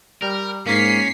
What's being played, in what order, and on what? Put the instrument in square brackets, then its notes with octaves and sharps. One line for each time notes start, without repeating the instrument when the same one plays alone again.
[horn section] G3 [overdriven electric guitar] A#4
[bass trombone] G#2 [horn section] A#3 [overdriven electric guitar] C#4 [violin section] B6 C7